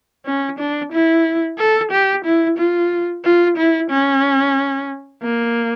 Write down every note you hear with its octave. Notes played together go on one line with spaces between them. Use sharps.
C#4
D4
E4
A4
G4
E4
F4
F4
E4
C#4
A#3